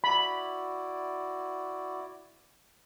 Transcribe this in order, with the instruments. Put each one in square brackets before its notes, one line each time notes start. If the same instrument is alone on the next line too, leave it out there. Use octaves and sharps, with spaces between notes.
[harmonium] E4 F#4 D5 [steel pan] B5